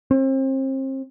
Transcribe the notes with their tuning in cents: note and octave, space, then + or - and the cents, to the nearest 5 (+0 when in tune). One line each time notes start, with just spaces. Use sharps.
C4 +35